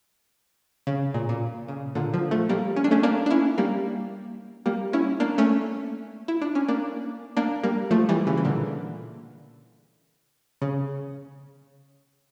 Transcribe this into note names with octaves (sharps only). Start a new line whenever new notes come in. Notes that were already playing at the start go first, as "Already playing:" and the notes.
C#3
A#2
A#2
C#3
A#2 D3
D3 F3
F3 A3
G3 A#3
C#4
D4
A3 C#4
A#3 D4
D4
C#4 E4
G3 A#3
G3 A#3
C#4 E4
A#3 D4
A3 C#4
E4
D4
C#4
A#3 D4
A#3 D4
G3 A#3
F3 A3
E3 G3
C#3 E3
E3
A#2 D3
C#3